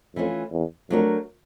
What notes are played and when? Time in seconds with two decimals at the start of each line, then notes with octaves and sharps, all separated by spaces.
0.15 F2 E3 A3 C#4 F4
0.52 E2
0.90 F2 F#3 A3 D4 F#4 A#4